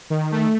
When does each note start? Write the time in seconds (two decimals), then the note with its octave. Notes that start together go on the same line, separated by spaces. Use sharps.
0.10 D#3
0.32 A3